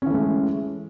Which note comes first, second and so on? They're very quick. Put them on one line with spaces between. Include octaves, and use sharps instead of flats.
C#4 E3 A3 G#3